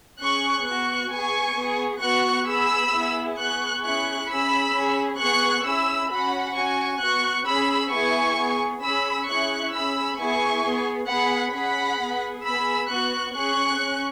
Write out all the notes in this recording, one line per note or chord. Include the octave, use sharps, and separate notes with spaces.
C#4 G#4 C#6 F#6
B3 F#4 C#6 F#6
B3 G#4 G#5 C#6
B3 G#4
B3 F#4 C#6 F#6
B3 G#4 B5 E6
B3 E4 G#4
B3 G#4 C#6 F#6
C#4 E4 G#4 C#6 F#6
C#4 G#4 B5 E6
C#4 G#4
B3 G#4 C#6 F#6
C#4 E4 G#4 B5 E6
C#4 F#4 F#5 B5
C#4 F#4 G#5 C#6
B3 F#4 C#6 F#6
C#4 G#4 B5 E6
B3 E4 G#4 G#5 C#6
B3 G#4
C#4 G#4 B5 E6
C#4 E4 G#4 C#6 F#6
C#4 G#4 B5 E6
B3 E4 G#4 G#5 C#6
B3 G#4
B3 G#4 F#5 B5
C#4 G#4 F#5 B5
B3 G#4
B3 G#4 B5 E6
B3 F#4 C#6 F#6
C#4 G#4 C#6 F#6
C#4